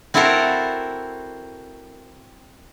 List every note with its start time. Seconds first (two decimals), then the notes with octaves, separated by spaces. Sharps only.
0.14 C4 E4 F#4 A4 A#4 C5